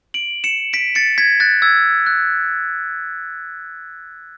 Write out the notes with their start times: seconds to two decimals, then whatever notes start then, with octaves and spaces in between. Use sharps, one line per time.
0.14 D7 F#7
0.44 C#7 E7
0.73 B6 D7
0.95 A6 C#7
1.18 G#6 B6
1.40 F#6 A6
1.62 E6 G#6
2.06 F#6